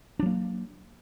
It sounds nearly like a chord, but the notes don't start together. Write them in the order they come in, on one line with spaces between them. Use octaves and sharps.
D4 F#3 A#3